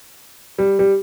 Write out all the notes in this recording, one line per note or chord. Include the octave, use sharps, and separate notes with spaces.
G3
G3